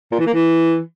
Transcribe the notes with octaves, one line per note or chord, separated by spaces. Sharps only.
A#2
E3
A#3
E3